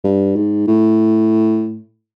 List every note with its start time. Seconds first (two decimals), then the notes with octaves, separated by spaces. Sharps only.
0.04 G2
0.36 G#2
0.67 A2